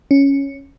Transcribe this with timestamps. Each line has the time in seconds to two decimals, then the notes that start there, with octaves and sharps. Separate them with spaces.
0.11 C#4